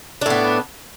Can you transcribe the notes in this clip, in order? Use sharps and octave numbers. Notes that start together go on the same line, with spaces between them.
A2 B3 D4